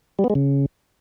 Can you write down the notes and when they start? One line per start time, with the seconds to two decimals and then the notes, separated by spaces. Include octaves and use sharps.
0.19 G3
0.24 B3
0.30 G#3
0.35 C#3